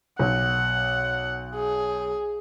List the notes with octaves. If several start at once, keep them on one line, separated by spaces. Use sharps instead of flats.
B1 F#5
G#4